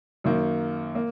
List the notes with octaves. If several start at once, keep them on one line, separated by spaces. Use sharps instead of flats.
F#2 D#3 A#3
A#3